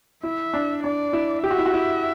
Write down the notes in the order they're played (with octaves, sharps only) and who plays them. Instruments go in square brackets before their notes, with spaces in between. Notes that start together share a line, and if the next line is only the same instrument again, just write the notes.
[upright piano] E4 [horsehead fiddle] E5
[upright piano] D4
[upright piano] D4 [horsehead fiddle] D5
[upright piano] E4
[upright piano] G4 [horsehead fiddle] E5
[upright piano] F#4
E4
F#4
E4